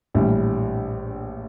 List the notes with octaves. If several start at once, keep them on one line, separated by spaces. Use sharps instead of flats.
A#1 A2 E3 G3 D4